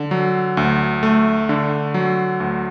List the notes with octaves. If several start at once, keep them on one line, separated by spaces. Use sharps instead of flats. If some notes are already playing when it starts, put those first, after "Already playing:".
Already playing: D3
F#3
D2
A3
D3
F#3
D2